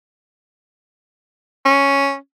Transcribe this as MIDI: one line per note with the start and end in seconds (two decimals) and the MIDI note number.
1.65 2.16 61